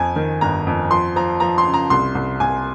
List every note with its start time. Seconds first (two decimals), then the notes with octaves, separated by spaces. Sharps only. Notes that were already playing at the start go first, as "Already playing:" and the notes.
Already playing: F2 G#5
0.16 D#3
0.41 G1 A#5
0.67 F2
0.91 F3 C6
1.16 F3 A#5
1.40 F3 A#5
1.58 C6
1.66 C#3
1.74 A#5
1.90 C2 C6
2.15 C2
2.40 C2 G#5